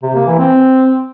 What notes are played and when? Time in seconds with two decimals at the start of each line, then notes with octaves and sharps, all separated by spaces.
0.03 C3
0.15 A#3
0.27 E3
0.39 C4